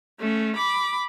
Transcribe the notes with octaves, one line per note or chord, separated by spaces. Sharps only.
A3 C#4
B5 D6